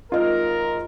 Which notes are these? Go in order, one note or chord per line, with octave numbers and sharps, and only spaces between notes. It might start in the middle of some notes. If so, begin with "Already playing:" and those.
G#1 F4 A#4 D#5